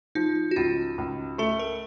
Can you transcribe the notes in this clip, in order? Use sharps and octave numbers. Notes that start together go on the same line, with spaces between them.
F3 D#4
F#4
C#2 F4
C#2
A3 A4
A#4